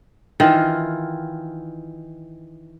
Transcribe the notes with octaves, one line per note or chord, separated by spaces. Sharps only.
D#3 E3 F4